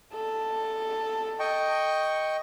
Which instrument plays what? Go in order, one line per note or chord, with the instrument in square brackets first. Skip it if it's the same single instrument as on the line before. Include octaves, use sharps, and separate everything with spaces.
[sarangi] A4
[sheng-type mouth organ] D#5 G5 C#6